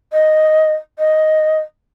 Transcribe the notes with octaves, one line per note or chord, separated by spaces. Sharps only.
D#5
D#5